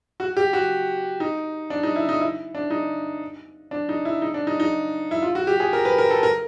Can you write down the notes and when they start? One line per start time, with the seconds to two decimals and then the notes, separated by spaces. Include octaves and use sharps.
0.20 F#4
0.37 G4
0.53 F#4
1.20 D#4
1.70 D4
1.83 D#4
1.96 E4
2.09 D#4
2.21 E4
2.55 D4
2.70 D#4
3.71 D4
3.89 D#4
4.05 E4
4.22 D#4
4.34 D4
4.47 D#4
4.60 D#4
5.11 E4
5.22 F4
5.35 F#4
5.47 G4
5.60 G#4
5.73 A#4
5.85 B4
5.98 A#4
6.10 A4
6.23 A#4